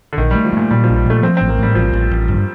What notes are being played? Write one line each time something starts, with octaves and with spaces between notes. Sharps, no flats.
D3
A#1 D#3
G3
A3
F3
A#2 A3
A#2 G3
F3
A#1
G3
A#2 A3
F3 C4
C4
A1
A#3
A2 G3
A1 F3
A1
A1
G2